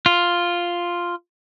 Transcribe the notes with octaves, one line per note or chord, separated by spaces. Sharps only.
F4